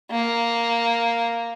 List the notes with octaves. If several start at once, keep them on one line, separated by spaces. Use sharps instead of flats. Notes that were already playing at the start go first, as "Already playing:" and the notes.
A#3